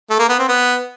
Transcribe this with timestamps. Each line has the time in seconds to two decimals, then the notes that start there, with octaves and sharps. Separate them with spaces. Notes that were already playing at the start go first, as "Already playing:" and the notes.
0.10 A3
0.19 A#3
0.29 B3
0.39 C4
0.48 B3